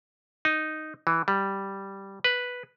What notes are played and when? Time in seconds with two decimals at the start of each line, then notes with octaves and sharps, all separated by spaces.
0.45 D#4
1.07 E3
1.28 G3
2.24 B4